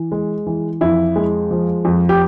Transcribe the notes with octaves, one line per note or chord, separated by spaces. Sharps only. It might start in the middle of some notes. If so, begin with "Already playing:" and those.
Already playing: E3
G#3
E3
F2 E4
G#3
F3
F2
G4